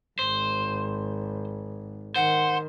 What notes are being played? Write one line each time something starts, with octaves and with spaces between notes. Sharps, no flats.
G#1 C5
D#3 C5 F#5